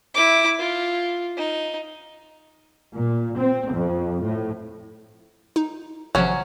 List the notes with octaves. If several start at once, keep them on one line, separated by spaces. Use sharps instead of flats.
E4 D6
F4
D#4
A#2
C4
F2
A2
D#4
G#1 C3 F3 F#3 C#4